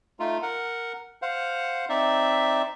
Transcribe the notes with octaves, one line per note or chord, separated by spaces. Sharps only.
A3 D#4 F4
A#4 F#5
C5 F5 F#5
C4 D#4 D5 E5